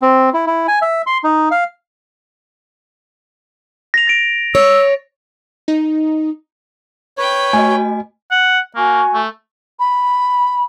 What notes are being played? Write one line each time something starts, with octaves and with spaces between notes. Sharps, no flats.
C4
E4
E4
G#5
E5
C6
D#4
F5
A#6 F7
A6 D7
C#5 E6
D#4
B4 C#5 G5
A3 F#4 D#5 G#5
F#5
A#3 F#4 G#5 C#6
A3
B5